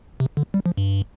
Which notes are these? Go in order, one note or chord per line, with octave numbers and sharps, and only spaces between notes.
C3
D3
G3
F3
G2